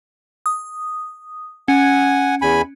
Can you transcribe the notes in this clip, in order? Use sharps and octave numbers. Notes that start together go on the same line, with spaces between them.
D#6
C#4 F#5 G#5
E2 G#5 B5